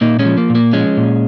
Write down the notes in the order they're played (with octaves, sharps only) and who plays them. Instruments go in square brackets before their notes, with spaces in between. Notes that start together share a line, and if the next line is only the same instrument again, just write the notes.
[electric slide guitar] A#2 A#3 D#4
G#3 C#4
F3
A#3
A#2
A#3
F3 G#3 C#4
A#2